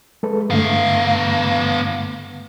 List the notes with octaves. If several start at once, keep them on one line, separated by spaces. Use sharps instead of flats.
G#3 A4 B4
G2 D3 A3 B3 F5